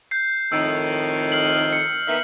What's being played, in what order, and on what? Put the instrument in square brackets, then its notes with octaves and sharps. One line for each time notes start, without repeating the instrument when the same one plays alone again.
[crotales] G6 C7
[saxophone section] F2 A2 D#3 [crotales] E6
[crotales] F6 C7 F#7
C#7
[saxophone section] D#3 B3 E5